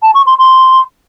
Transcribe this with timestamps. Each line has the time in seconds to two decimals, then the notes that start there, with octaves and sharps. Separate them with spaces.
0.03 A5
0.15 C#6
0.26 C6
0.38 C6